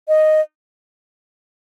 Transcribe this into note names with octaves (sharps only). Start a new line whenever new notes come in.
D#5